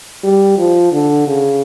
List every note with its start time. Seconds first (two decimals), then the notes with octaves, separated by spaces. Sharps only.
0.24 G3
0.58 F3
0.93 D3
1.27 C#3